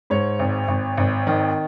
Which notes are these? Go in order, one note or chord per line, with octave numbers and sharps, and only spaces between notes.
G#2 C#5
G#1
G#1
G#1
D#3